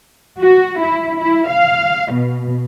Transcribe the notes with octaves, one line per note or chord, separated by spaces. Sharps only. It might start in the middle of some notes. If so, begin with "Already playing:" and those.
F#4
E4
E4
F5
B2